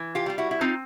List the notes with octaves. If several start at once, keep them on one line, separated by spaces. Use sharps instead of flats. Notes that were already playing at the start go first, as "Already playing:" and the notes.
Already playing: E3
F4 G4
G3 F4
E4 F#4
E4
C4 D#4 F4